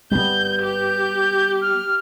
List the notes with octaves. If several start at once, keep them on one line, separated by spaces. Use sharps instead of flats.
G3 A3 B3 G6
G4 G6
F6